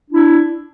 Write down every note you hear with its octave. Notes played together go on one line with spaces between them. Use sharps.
D4 E4